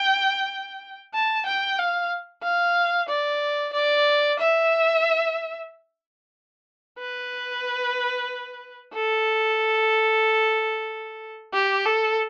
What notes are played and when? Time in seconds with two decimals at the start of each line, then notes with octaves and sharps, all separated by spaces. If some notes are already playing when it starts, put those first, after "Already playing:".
Already playing: G5
1.15 A5
1.47 G5
1.79 F5
2.43 F5
3.09 D5
3.73 D5
4.39 E5
6.99 B4
8.93 A4
11.54 G4
11.86 A4